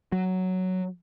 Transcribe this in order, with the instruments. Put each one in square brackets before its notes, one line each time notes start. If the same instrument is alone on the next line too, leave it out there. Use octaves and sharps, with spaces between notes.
[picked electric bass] F#3